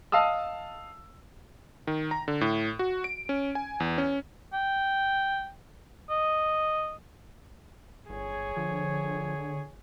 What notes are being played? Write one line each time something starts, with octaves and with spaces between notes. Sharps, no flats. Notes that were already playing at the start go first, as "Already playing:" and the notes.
D#5 F5 A5 D#6 E6
D#3
A#5
D3
A2
F#4
D7
C#4
G#5
E2
C#4
G5
D#5
G1 G#4 C#5
D3 F3